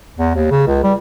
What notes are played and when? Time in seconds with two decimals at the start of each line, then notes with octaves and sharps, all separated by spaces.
0.19 E2
0.35 D#2
0.51 C#3
0.68 C#2
0.84 G3